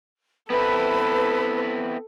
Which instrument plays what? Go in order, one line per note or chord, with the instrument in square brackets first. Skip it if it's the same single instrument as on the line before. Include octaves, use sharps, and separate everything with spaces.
[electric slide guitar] B3 C4 E4 [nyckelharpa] A4 [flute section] B4 B5